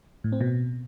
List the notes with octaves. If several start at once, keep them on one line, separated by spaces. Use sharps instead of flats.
A2
C4
B2